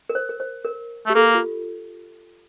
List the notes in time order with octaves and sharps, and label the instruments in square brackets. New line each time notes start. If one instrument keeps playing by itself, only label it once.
[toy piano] A#4
C5
A#4
C5
A#4
[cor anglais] A3 [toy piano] G4
[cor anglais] A#3 [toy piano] A4
[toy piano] F4